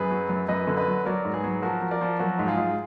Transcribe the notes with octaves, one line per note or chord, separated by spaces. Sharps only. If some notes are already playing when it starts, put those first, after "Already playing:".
Already playing: F#2 G#4 B4
F#3
F#2
F#2 B4 D#5
D3
B4 D#5
F#3
F#3 A#4 D5
G#2
G#4 B4
F#3
F3 F#4 A#4
F3
A#4 D5
F3
F#3 F#4 A#4
G#2
F4 G#4
G#2